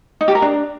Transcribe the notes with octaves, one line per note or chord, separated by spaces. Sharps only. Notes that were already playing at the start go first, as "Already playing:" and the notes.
D#4
G4
A#4
D4